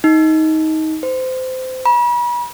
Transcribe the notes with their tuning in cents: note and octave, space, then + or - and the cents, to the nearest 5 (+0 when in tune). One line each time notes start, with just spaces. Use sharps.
D#4 +20
C5 -20
B5 -40